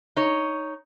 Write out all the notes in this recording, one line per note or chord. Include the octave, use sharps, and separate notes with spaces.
D#4 C#5